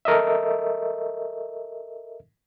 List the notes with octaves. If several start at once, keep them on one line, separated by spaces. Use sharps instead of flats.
A4 A#4 D#5 E5